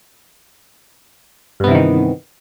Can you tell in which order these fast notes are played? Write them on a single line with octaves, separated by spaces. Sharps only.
G2 B3 C3 E3 D#3